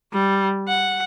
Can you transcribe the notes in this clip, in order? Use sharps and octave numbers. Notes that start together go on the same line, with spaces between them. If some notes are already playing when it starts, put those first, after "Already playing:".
G3
F#5